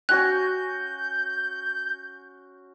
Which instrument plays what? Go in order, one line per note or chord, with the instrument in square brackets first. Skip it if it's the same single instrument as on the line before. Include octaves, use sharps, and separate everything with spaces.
[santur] C#4 F#4 G#5 [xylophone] F#6 [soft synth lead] G6